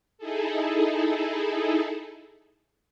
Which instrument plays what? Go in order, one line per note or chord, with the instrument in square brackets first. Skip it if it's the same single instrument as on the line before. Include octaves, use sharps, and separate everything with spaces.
[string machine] D#4 E4 G#4 A4